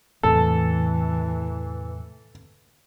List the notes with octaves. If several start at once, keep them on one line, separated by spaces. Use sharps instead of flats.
E2 A2 C3 E3 A4